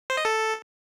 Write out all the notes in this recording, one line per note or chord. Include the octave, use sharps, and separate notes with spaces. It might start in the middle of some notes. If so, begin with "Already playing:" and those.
C5
D#5
A4